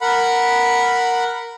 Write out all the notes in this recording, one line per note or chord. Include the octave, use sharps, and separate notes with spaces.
A#4 F#5 B5